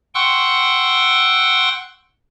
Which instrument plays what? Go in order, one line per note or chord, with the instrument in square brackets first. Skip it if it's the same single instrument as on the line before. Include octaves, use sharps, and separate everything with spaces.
[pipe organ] F#5 G5 C6 C#6 E6 F#6